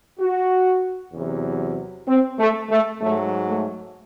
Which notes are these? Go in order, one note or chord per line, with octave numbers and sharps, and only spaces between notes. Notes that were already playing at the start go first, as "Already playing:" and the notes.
F#4
E2 C3 F#3
C4
A3
A3
G#2 F#3 A3
A3